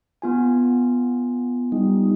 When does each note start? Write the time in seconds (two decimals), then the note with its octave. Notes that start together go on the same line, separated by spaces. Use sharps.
0.22 B3 F4 G#5
1.72 G3 D#4